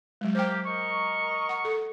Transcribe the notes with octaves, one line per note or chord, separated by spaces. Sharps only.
F#3 G#3
A#3 G4 C5 G5
A#4 D#5 C#6
F#5
A4